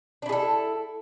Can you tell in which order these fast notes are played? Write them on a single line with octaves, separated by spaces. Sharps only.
D4 E4 G#4 A4